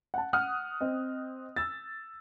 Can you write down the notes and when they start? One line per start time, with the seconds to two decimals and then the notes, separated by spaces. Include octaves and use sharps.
0.14 F#5 A5
0.33 F#5 D#6 F6 F#6
0.81 C4 D#5
1.56 E6 A6